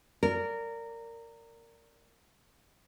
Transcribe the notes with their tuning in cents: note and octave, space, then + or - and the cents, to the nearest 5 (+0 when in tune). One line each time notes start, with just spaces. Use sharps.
A#4 -15 D5 -20